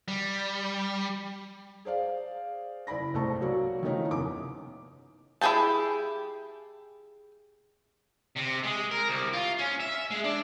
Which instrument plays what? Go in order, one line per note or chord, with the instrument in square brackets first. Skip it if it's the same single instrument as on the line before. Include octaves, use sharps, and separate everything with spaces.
[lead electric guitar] G3
[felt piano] G#4 C5 D5 F5
F#1 E4 D5 B5 A#6
C2 G#2 A3 C5 A5 C#6
F#3 A#3 F#4 D5
D#3 F3 A3 C#4 D#4 E4
F1 F#2 B3 D6
[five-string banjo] E4 G4 G#4 G5 A5
[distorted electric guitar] C3
G#3
A#4
C2
F4
C#4
E5
G#3
D4